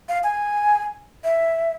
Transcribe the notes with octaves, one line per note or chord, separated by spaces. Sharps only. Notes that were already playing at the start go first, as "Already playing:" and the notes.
F5
G#5
E5